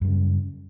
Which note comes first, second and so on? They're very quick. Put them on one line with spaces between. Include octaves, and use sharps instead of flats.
F#2 G3 C#3